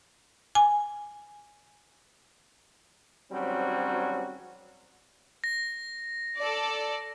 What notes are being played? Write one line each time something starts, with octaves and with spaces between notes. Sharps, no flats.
G#5
G#1 F#3 G3 C4 C#4 F#4
A#6
A4 D5